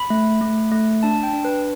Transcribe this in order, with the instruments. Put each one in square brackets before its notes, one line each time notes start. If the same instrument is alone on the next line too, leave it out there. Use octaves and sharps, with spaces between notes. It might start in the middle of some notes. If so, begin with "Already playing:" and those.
Already playing: [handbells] B5
A3
A3
A3
D4 A5
G5
D4
B4